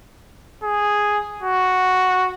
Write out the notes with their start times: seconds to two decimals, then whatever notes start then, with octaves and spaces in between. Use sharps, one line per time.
0.63 G#4
1.43 F#4